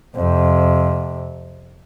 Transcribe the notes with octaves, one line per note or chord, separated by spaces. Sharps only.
F2 C3